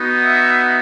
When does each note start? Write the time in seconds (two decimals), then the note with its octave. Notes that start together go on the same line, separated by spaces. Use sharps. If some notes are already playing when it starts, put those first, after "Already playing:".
Already playing: B3 D#4 F#4
0.25 E5